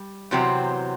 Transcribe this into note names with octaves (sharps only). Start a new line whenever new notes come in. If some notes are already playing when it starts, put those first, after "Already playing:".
Already playing: G3
E2 C3 F#3 C4